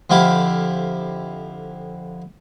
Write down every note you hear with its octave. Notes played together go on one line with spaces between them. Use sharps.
F2 D3 E4 G4 F5 D6